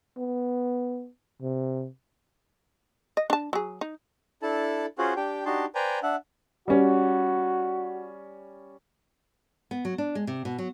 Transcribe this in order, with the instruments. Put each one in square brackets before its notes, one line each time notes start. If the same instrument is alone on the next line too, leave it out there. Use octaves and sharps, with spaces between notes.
[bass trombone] B3
C3
[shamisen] D#5
D4 A5
F#3 G#4
D#4
[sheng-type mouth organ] D4 E4 A4 A5
C#4 F4 F#4 G#4 C5 F#5
D4 G4 G5
D4 D#4 F#4 G4 A5 C6
B4 C5 D5 G5 G#5 A#5
D4 E5 F#5
[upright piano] G3 C#4 [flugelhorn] F#4
[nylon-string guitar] B3
F#3
D4
G#3
C3
B2
F#3